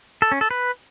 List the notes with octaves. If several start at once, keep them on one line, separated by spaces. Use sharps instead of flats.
A4
C#4
A4
B4